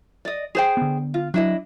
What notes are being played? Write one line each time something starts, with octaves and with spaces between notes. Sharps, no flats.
D5 D#5
G#4 C5 G5
D3 B3
F4
F#3 D4 E4 D#5